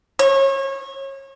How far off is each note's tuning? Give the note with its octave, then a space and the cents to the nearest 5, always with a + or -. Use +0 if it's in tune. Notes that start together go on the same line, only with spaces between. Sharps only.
C#5 -30